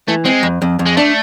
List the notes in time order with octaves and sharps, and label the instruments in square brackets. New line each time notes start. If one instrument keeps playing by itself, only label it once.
[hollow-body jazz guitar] E3 [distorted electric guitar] A3
[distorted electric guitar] G#3 [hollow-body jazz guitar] C4
[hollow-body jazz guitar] F2
F2
F2
[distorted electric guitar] G#3
[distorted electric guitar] A3 [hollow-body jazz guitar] D4